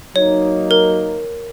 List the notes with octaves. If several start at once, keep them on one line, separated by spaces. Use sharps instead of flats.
F#3 A#3 D#4 C#5
A#4